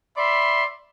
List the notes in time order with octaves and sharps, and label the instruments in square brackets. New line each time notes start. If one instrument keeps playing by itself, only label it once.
[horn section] D5 E5 B5 C6